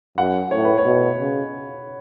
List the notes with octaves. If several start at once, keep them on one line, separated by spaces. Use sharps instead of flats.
F#2 F#5
A2 C#5
B4
C#5
B2
C#3